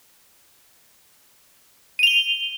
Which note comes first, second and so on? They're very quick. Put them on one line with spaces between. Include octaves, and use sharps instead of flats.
D#7 F7 G7